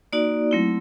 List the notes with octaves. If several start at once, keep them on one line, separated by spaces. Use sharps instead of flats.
A#3 D#4 F#4 D5
F#3 A3 C4 E4